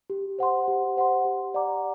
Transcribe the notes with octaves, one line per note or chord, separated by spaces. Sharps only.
G4
C5 F#5 C6
G4
C5 F#5 C6
G4
D5 F#5 A#5 D6